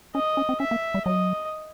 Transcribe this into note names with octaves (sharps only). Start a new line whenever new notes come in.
C#4 D#5
C#4
C4
C#4 E5
A#3
G3
F#3 D#5